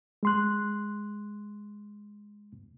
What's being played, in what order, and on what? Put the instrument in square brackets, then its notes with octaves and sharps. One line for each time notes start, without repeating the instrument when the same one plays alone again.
[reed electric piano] G#3 C6 F#6